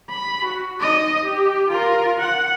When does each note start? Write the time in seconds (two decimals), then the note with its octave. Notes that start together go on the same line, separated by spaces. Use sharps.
0.10 B5
0.45 F#4
0.80 D#4 D#5
1.22 G4
1.69 F4 A#4
2.19 F#5